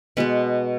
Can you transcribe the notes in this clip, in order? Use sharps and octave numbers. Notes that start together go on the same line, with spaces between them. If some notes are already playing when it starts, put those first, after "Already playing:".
B2 G#3 B3 B4